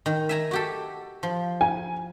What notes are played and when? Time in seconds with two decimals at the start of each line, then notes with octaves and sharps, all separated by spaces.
0.06 D#3
0.29 E5 G#5 A#5
0.51 F#4 G4 A4
1.23 F3
1.61 G#5